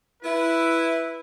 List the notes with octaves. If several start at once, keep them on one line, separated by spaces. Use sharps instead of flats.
E4 B4